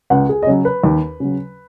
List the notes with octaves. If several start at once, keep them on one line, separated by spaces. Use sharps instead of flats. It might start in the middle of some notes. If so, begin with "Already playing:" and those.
C#2 F#5
G#4
D#5
C#3 F#3 C#5
B4
D#2
C#3 F#3